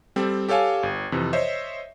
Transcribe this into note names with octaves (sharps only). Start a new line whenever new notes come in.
G3 C4 A4
G4 A4 C#5 F5 G#5
G1
F2 C3 E3
C5 C#5 D#5 E5